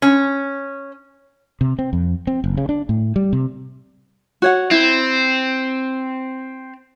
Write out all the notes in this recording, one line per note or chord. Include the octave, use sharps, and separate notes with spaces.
C#4
C3
C4
F2
C4
F#1
C#3
D4
A2
G3
C3
F#4 C#5 F#5
C4 E4